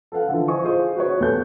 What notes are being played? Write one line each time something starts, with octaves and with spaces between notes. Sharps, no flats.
A4 B4 F5 F#5
D3 E3 F3
C5 D#5 G#5 C#6 D#6
F4 G#4 C5 D#6
F#4 B4 C#5
D#2 B3 A4 G#5 G6